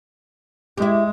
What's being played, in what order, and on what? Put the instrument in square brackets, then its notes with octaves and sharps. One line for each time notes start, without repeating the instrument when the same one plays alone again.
[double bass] G#3 [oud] E4 G4